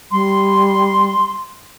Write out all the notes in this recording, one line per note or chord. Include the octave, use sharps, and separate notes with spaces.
G3 C6